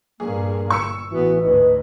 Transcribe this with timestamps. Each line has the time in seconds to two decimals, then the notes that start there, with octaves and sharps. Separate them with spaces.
0.20 G2 A#2 A#3 G#4
0.70 G1 C#6 E6 C#7
1.11 A1 E3 B3 F#4
1.42 D2 G#2 B4 D#5